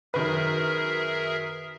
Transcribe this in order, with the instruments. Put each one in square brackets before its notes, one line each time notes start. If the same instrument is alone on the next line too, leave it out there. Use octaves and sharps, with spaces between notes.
[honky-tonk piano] F#2 D#3 B4 [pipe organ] G#4 A#4 E5